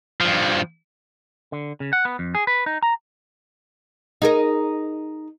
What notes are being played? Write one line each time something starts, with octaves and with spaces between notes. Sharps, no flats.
G2 F3
D3
C#3
F#5
B3
F2
G#4
B4
D#4
A#5
D#4 G#4 A#4